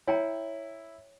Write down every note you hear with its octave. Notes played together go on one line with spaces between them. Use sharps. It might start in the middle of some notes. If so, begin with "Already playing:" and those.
E4 C#5 G5 A#5